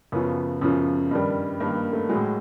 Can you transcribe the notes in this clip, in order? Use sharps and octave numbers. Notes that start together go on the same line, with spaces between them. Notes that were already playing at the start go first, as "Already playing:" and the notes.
F#2 C#3 F3 B3
F#2 C#3 F3
G2 D#3 G3
G2 D#3 G3 A#3
A#3
A3
F#3 G#3
A2